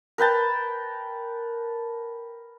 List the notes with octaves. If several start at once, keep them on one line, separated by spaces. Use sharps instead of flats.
A#4 B4 G5 A5